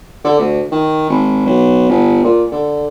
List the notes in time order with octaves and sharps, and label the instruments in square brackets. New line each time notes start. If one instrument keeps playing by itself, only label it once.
[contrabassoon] D3
D2
D#3
G#1
B1
G1
A#2
D3